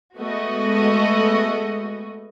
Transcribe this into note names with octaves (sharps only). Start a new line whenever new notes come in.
G#3 A3 B3 F#4 D#5